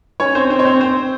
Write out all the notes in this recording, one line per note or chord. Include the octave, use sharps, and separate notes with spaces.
C#4 C#5
C4 C5
C4 C5
C#5
C4 C5
C4 C5